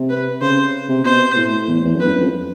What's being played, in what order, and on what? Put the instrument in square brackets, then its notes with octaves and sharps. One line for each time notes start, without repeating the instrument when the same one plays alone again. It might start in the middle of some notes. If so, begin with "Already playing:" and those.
Already playing: [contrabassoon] C3
[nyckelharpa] B4
[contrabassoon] C#3 [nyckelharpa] C5
[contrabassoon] C3
[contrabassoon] B2 [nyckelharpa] C5
[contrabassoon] A2
E2
E2
F#2
[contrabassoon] F2 [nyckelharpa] B4
[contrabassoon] G2
F#2
F2